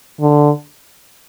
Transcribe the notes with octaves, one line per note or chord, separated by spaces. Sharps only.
D3